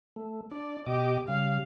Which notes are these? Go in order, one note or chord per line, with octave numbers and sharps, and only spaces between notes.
A3
D4 D5
B2 G4 D#5 D6
C#3 G3 F5